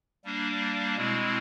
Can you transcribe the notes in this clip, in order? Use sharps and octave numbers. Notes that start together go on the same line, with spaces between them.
G3 A#3 D4
B2 G#3 C4 E4